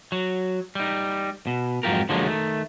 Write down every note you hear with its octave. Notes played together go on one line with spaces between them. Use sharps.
F#3
G3 D#4
B2
F2 G#2 F#3 F4 G4 A#4
D3 F3 F#3 G#3 A#3 C#4
D#3 A3